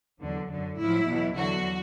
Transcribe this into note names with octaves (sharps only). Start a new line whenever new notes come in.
E2 D3 F#3
F#2 D3 F#3
A2 F#3 E4
E2 B2 F#3
E2 D3 F#3 F#4